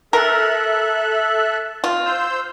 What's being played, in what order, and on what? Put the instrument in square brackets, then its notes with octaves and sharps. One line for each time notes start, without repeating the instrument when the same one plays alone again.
[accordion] A4 E5 F#6 [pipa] A#4
[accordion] C4 [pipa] F4
[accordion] C5 E6 G6